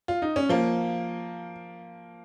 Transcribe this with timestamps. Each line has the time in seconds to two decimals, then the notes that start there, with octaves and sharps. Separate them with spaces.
0.08 F4
0.22 D#4
0.36 C#4
0.49 F3 A#3